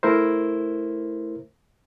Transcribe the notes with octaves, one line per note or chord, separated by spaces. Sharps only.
A3 E4 A#4 C5